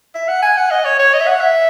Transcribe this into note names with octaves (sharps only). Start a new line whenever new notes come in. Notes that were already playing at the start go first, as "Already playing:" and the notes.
E5
F#5
G#5
F#5
D#5
C#5
C#5
D#5
E5
F#5
E5